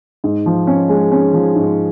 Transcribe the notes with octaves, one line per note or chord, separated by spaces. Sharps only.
G#2
F3
C#4
G#3
C#4
F3
G#2